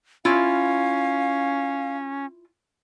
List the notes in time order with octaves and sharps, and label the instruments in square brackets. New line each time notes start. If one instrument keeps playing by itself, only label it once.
[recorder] C#4 [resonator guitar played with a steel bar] E4 F4 [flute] F5